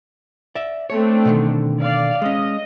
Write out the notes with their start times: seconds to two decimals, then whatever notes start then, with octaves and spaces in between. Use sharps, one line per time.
0.55 D5 E5
0.90 A3 C4 D4 C#5
1.25 B2 D3 D#3
1.80 D5 F5
2.22 G#3 C#4 D#5